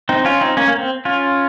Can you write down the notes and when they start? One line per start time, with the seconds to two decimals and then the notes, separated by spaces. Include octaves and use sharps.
0.09 C4 D#4
0.25 C#4 F4
0.41 C4 D#4
0.57 A#3 C#4
0.68 A#3
0.79 C4
1.05 C#4 F4